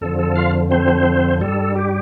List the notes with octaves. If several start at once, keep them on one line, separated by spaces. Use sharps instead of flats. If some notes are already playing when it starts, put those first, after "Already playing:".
F2 D3 F3 A4
A4
F4 F5
C4 C5
G2 G3 A4
G4